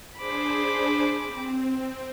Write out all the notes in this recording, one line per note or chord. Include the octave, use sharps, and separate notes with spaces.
D4 G#4 C5 B5 D6
C4